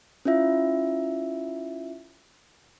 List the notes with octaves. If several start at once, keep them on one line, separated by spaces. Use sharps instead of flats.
C#4 E4 F4 E5